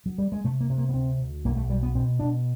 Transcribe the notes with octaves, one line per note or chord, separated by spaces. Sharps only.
F#3
G3
G#3
C3 A3
A#3
C3
A#3
B3
D2 C4
D2
B1 A#3
A3
B1 G3
B3
B2 C4
B2 D4